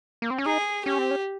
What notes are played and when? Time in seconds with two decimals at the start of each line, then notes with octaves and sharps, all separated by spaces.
0.22 A#3
0.31 C4
0.38 C#4
0.46 D#4 G#4
0.85 C#4 G4
0.98 C4
1.11 C#4